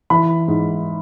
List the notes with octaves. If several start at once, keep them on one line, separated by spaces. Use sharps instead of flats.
E3 B5
G#2